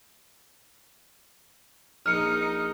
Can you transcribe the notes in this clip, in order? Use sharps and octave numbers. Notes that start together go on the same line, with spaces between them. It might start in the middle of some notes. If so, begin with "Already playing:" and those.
A#1 D#4 F6 C#7